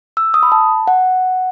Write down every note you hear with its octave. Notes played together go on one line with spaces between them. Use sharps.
E6
D#6
B5
A5
F#5